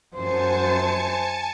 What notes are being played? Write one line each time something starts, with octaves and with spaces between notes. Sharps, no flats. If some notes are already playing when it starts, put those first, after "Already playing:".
F#2 C5 G#5 A5 C#7